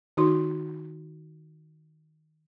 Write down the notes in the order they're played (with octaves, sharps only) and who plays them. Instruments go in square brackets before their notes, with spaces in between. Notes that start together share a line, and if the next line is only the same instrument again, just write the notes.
[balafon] D#3 D#4 F#4 C6